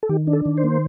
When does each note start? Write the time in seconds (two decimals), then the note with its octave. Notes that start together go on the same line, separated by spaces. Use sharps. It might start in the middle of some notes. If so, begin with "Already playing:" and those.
0.03 A4
0.09 D#3 G4
0.27 D4
0.33 A4
0.45 D#3
0.58 C5
0.64 A#3